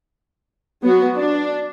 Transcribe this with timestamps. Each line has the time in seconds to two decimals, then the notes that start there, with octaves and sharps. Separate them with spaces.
0.81 F#3 B3 F#4
1.16 D4